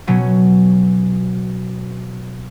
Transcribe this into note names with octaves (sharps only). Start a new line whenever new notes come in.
B2 F#3 C#4